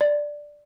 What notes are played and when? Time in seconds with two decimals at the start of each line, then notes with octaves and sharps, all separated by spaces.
0.01 D5